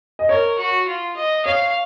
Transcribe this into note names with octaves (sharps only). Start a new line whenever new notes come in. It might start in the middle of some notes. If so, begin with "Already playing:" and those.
D#5
A#4 C#5
F#4
F4
D#5
C#5 F5